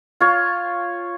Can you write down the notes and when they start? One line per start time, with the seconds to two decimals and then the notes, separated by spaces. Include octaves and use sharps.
0.20 F4 C#5